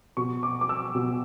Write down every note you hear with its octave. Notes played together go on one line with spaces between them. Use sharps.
B2 C#6
D6
D6
E6
B2